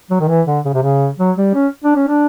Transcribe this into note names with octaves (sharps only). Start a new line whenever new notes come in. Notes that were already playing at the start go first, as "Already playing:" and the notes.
F#3
D#3
E3
D3
C#3
C3
C#3
F#3
G3
C#4
D4
C#4
D4